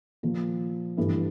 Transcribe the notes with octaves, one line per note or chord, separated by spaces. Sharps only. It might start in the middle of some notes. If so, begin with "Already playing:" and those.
A#2 F3 A#3 F4
G2 E3 A3 E4